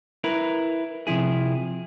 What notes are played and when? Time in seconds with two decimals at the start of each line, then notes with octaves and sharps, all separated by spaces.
0.24 E4 A#4 B4
1.07 C3 F3 E4 G#4